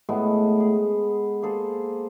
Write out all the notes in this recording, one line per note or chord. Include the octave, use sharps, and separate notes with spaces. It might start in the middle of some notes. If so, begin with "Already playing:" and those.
A2 G#3 A3 B3
G#4
A#3 G#4 A4 C5